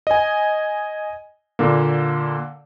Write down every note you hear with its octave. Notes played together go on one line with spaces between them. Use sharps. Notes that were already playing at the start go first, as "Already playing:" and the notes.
D#5 G#5
A#2 D3 A#3